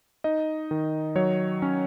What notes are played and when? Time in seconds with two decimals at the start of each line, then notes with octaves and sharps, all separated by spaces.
0.24 D#4 D#5
0.71 D#3
1.15 F#3 C#5
1.62 C#4